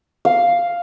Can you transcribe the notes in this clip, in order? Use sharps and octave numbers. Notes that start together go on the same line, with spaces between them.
F5